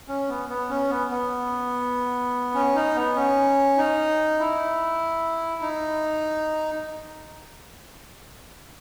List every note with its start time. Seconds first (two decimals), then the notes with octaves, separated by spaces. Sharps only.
0.08 C#4
0.29 B3
0.49 B3
0.69 C#4
0.90 B3
1.11 B3
2.55 C#4
2.75 D#4
2.96 B3
3.16 C#4
3.77 D#4
4.39 E4
5.62 D#4